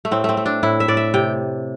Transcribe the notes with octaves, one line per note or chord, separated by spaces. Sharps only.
A3
A2 C4
A3 C4
A3
D4
A2 E4
E5
A2 D5
E5
C3 G5